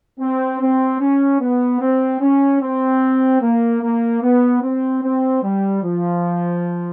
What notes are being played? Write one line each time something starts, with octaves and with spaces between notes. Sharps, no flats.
C4
C4
C#4
B3
C4
C#4
C4
A#3
A#3
B3
C4
C4
G3
F3